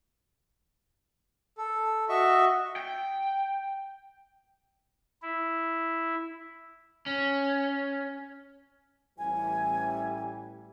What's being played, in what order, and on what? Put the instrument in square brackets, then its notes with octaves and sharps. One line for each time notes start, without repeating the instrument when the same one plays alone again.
[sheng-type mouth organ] A4
F#4 D#5 E5 C#6
[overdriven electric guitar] G5
[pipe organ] E4
[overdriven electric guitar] C#4
[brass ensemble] A1 E3 G3 [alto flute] G#5